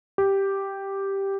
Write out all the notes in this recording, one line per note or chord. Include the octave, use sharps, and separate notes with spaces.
G4